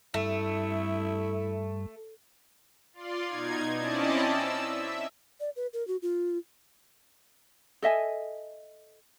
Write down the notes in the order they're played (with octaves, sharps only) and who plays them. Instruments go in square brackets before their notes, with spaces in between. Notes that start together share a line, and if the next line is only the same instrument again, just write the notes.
[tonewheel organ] G2 [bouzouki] A3 [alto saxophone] E4
[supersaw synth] F4 D5 C6
B2 D#4 G#6
C4 C#4 E4 D5 D#5 A5
E6
E5
[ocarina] D5
B4
A#4
F#4
F4
[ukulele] A4 D#5 E5 G#5